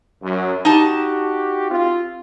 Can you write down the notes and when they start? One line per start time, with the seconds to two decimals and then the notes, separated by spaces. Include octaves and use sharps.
0.22 F#2
0.65 D#4 F#4 G4 A5
1.69 C4 F4